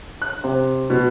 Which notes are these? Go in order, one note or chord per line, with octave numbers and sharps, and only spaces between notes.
F#6
C3
B2